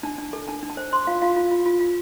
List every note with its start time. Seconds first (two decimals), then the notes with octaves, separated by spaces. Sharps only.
0.03 D4 A5
0.18 D4
0.33 A4
0.48 D4 A5
0.63 D4
0.70 A5
0.77 C5
0.92 C5 C6
1.07 F4 F5
1.22 F4 F5
1.36 F4
1.51 F4
1.66 F4
1.81 F4